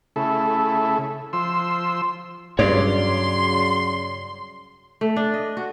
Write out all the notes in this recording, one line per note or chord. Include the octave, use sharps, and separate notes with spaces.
C#3 A3 E4 A4
F3 C6 E6
G2 C#3 F#3 C#5 D5 C6
A3
D4
D#5
F#4